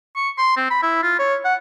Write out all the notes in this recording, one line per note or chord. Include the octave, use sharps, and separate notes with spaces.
C#6
C6
C4
B5
E4
F4
C#5
F#5